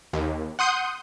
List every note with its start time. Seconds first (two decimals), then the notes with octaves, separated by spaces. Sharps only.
0.13 D#2
0.59 F#5 C6 D#6 G6